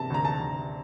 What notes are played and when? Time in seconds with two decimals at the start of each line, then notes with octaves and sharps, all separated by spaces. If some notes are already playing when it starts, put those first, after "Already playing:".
Already playing: C3 A5
0.10 D2 A#5
0.25 A5
0.40 D2